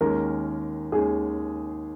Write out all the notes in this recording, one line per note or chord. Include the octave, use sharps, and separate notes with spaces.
D#2 D#3 G#3 C#4 A#4
D#2 D#3 G#3 C#4 G#4